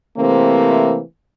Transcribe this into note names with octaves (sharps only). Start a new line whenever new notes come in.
C3 E3 A3 A#3 C4